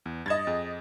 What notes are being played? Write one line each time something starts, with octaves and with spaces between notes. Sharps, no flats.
E2
G2 D#5 G#6 A6 E7
F2 G#4